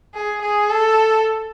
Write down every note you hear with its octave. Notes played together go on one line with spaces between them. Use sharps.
G#4
G#4
A4